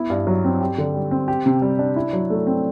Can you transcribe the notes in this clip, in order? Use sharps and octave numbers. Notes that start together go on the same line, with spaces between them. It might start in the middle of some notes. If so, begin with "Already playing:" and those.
Already playing: B3 E4
G2
F#3
C4
G4
D3
G3
C4
G4
C3
G3
D4
E4
F#3
A3
C4